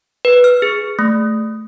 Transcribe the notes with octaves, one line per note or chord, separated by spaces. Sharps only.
B4
F6
G#4
A3